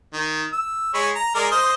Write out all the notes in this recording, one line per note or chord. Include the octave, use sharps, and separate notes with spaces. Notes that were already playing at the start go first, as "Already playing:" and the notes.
D#3
E6
G#3 C#5 B5
A#5
G#3 A#4 D5
C5 D#5 C6